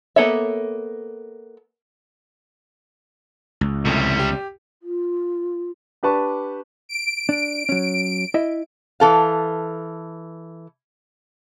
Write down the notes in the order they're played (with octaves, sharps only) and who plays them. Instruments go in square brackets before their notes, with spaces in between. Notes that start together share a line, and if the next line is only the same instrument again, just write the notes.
[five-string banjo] A#3 B3 A4 C#5 E5
[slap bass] C#2
[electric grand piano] C2 F2 A2 [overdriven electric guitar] C3 G3
[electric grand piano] G4
[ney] F4
[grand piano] D4 G4 B4 A5 C#6
[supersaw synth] D7
[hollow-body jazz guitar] D4
F#3 C#4
E4 D#5 E5
[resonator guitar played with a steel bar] E3 A4 F5